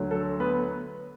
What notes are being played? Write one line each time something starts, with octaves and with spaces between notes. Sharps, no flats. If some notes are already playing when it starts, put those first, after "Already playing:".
Already playing: D2 D3 F#3
A4
B3 B4